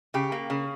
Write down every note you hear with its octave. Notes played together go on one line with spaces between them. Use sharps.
C#3 G4
A#3
C#3